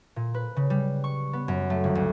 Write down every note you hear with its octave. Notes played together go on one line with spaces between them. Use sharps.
A#2
B4
C#3
G3
C#6
B3
F#2
A3
G1
D2